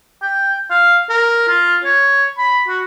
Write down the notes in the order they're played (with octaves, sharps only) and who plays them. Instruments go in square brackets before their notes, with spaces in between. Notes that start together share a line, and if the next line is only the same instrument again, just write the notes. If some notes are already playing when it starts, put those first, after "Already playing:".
[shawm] G5
F5
A#4
F4
C#5
B5
F#4